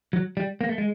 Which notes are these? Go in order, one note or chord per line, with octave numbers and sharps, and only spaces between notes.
F#3
G3
A#3
A3
G#3